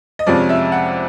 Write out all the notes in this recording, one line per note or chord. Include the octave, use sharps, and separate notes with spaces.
D#5
F2 C3 F3 G#3 C#4 D5
E5
F#5